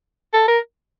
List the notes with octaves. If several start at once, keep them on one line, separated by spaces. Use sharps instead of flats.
A4
A#4